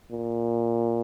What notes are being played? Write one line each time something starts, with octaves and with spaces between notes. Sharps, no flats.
A#2